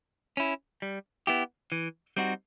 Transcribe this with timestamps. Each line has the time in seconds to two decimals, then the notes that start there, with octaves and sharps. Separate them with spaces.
0.37 C#4 E4
0.82 G3
1.27 B3 E4 G4
1.72 E3
2.17 G3 C4 D#4 F#4